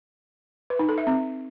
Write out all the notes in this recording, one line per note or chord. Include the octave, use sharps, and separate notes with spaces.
B4
D#4
A4
E5
C4